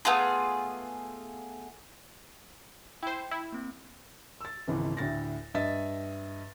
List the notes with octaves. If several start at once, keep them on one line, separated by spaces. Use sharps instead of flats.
A3 B3 F4 G#4
E4 C5 G5
E4
A#3 C4
E6 A6
G#1 C#2 E3
D2 A2 A6 A#6
G2 D#5 E5 A6